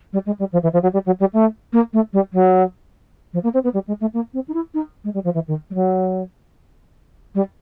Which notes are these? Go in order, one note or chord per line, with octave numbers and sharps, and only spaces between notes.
G3
G#3
G3
F3
E3
F3
F#3
G3
F#3
G3
A3
A#3
A3
G3
F#3
F3
A#3
C4
B3
G3
G#3
A3
A#3
C4
D#4
E4
D#4
G#3
G3
F3
E3
D#3
G3
F#3
G3